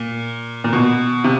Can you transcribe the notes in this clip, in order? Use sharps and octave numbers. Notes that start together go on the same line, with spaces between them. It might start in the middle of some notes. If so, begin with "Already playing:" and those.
Already playing: A#2
A#2
B2
C3